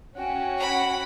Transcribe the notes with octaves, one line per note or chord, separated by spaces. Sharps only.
C#4 F#4 G5
F#5 B5